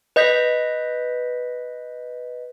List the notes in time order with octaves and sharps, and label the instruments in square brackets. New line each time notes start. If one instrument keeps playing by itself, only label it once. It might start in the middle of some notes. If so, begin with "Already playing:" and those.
[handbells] B4 D#5 G6 A#6 B6